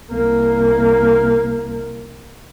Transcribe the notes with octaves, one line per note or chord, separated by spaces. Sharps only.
C2 A#3